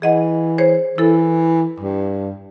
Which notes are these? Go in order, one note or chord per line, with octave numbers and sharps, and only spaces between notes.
E3 G#4 D#5 F#5
G#4 C5 C#5
E3 E4 A4
G2